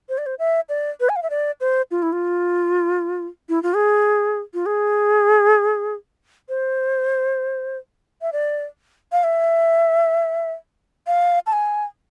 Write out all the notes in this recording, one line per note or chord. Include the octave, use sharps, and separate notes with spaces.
C5
D5
C5
E5
D5
B4
G#5
F5
E5
D5
C5
F4
E4
F4
E4
F4
G#4
F4
G#4
C5
E5
D5
F5
E5
F5
A5
G#5